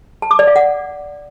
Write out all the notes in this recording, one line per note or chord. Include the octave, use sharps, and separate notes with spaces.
A5
D6
D5
F5
F#5